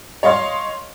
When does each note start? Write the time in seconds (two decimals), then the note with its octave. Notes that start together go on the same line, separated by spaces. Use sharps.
0.23 C#5 D#5 F5 C6